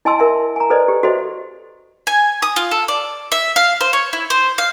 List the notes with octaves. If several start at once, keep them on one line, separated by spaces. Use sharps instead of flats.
E4 D#5 G#5 A5 C6 E6
A#4 E5 G#5
G#5 A#5
A4 B4 C5 D5 D#5
G4
F#4 A4 C5 D#5 E5
G#5
D#6
F4
A4
D5
E5
F5
C5
C#5
E4
C5
F5